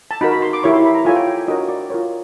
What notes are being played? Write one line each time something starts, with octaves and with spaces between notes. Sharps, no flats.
A5
D#4 F#4 A#4 B5
B5
C6
D6
E4 G4 A#4 C#5 C#6
C6
B5
A#5
F4 A4 C#5 G#5
G5
G5
D4 F#4 A#4 C#5 D#5
D5
F4 A#4 C#5